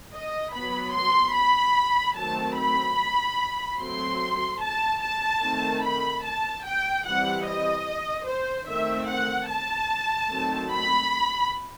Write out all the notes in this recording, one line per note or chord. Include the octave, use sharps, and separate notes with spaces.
D#5
F#3 B3 B5
C6
B5
D#3 F#3 A3 C4 A5
B5
F#3 A3 C4 C6
A5
A5
D#3 A3 C4
B5
A5
G5
E3 G3 C4 F#5
D#5
C5
D#3 A3 C4 E5
F#5
A5
D#3 F#3 A3 C4
B5